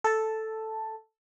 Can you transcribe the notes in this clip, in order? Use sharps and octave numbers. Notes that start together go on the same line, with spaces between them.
A4 A5